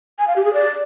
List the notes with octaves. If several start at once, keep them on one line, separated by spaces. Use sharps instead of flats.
G#5
F5
G4
G#4
D5